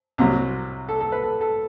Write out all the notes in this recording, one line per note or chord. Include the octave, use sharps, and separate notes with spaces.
C2 C3 F#3
A4
A4
B4
A4
A4